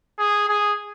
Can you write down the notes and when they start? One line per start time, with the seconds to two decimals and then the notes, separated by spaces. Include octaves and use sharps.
0.19 G#4
0.48 G#4